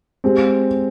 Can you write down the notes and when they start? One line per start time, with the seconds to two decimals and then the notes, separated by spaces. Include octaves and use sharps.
0.24 G#3 C4 G4